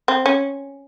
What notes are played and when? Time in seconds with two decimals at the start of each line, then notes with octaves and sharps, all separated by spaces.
0.08 C4
0.26 C#4